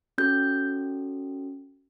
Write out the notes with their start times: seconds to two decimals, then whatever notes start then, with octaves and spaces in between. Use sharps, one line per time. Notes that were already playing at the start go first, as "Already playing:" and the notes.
0.18 C#4 F#4 A4 G6